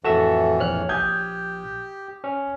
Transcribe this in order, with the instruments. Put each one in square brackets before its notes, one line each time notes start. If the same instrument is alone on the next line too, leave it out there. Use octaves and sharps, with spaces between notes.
[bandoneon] F2 A2 E3 [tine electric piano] F#4 E5 [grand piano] A4 E7
[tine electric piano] A#1 F6 F#6 [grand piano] C#5
[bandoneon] G4 [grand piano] D#6 G6 G#6
[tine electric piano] C#4